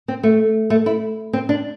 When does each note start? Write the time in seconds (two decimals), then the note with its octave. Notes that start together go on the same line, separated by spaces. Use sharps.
0.08 C4
0.23 A3
0.70 A3
0.86 E4
1.33 C4
1.49 D4